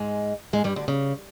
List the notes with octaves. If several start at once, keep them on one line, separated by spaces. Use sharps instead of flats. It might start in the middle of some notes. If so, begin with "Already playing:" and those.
Already playing: G#2 G#3
G#2 G#3
G2 G3
D2 D3
C#3